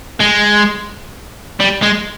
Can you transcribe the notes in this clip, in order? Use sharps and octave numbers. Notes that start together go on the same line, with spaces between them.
G#3
G3
G#3